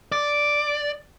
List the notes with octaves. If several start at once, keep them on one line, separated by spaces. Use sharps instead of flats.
D5